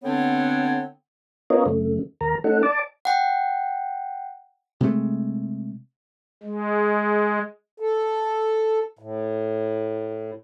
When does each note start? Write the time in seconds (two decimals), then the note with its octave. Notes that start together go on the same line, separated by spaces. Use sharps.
0.04 D3 B3 C4 D4 A4 C#5
1.50 B3 C#4 F4 A#4 C#5 D#5
1.66 F#2 C#3 A3
2.21 D#2 A#4 A#5
2.44 A3 C#4 D#4 A4 F#5
2.63 D5 A5 D6
3.05 F#5 G5
4.80 C3 G#3 A3
6.43 G#3
7.80 A4
8.99 A2